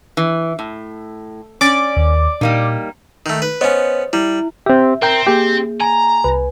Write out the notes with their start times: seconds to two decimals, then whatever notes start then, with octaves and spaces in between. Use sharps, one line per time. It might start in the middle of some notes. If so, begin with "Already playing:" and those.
0.17 E3
0.59 A2
1.61 C#4 D5 D6
1.96 D#2
2.41 A#2 G3 A#3 D#4
3.26 D#3 A3
3.42 B4
3.61 B3 C#4 C5 C#5 D#5
4.13 G3 E4
4.66 C4 G4 E5
5.02 C4 A#4 G5 A#5
5.26 A#3 G4 G#4
5.80 G#5 A#5
6.24 C2 B4